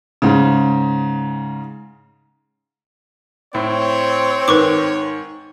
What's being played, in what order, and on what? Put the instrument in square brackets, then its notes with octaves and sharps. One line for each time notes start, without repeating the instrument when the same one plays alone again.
[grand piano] G#2 C#3
[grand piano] A2 [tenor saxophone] C4 [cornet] C#5
[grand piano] G#2 D#3 [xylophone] B4 C#6 D6